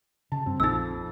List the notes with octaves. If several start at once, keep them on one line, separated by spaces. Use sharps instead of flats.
C#3 A5
G2 C4
A#1 F2 D#4 E6 A6